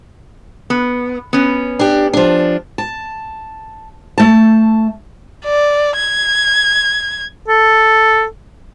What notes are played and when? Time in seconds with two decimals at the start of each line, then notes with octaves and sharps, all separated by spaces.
0.70 B3
1.33 B3 C#4
1.79 D4 G4
2.13 F3 D4
2.78 A5
4.18 A3 A5
5.45 D5
5.96 G#6
7.48 A4